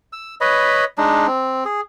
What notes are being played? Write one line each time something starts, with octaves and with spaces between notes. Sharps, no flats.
E6
B4 C#5 D#5 B5
G#3 D4 D#4
C4
G#4